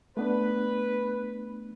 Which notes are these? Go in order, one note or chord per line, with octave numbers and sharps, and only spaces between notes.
A3 B3 D4 B4